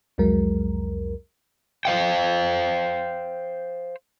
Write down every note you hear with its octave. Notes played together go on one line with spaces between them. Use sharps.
C2 F2 F#3 G#3 A#4
C5 F5 G5